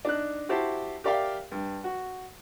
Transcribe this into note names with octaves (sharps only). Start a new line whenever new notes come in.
D4 D#4 F#6
E4 F#4 G4 C5 A5
G4 A#4 D5 E5 F5 G5
G2
F#4